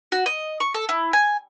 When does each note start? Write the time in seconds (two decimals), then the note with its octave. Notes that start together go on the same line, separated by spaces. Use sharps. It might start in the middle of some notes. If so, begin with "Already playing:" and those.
0.12 F#4
0.26 D#5
0.60 C#6
0.74 A4
0.89 E4
1.13 G#5